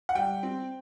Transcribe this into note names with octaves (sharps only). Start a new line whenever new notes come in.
F#5
G3 G5
C4